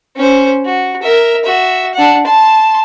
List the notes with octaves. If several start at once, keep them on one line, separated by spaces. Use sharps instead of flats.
C#4 C5
F#4
A#4 E5
F#4 E5
D4 F#5
A5 C6